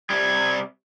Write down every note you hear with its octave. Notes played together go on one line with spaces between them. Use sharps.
C3 G3 G#6